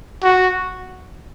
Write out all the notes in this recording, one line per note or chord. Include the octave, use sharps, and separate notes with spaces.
F#4